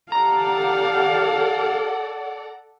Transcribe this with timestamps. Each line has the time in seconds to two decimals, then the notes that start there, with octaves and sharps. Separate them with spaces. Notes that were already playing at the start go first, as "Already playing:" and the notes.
0.12 G4 A4 D5 F5 F#5 A#5